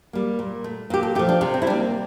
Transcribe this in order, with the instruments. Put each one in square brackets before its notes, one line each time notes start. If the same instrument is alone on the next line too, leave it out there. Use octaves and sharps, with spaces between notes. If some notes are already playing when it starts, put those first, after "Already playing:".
[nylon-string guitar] G3 A#3
A#2
A3
A#2 G4
A4
A3 G4
F3
D4
C3 D4
C4
E4
G3 D4
A#3